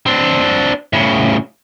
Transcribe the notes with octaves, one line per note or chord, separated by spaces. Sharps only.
C4 D4
A2 C#3